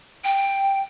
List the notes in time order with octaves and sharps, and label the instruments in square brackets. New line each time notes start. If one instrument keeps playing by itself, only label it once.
[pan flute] G5